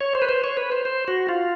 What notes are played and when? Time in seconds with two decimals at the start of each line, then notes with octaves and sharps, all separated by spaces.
0.01 C#5
0.15 C5
0.22 B4
0.29 C5
0.44 C#5
0.57 B4
0.72 C5
0.85 C5
1.08 F#4
1.29 F4